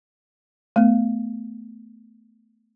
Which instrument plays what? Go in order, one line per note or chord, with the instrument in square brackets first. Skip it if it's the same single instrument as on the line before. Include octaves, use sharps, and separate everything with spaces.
[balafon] A3 B3